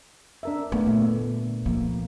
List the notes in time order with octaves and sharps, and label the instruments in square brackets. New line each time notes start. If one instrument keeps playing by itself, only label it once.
[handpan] D4 A#4 E5
[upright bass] A3 [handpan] B3
[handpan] A#2 A3 [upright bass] D3
[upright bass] F3 [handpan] A#3